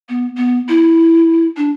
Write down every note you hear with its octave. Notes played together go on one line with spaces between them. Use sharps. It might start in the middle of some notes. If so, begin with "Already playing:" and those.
B3
B3
E4
D4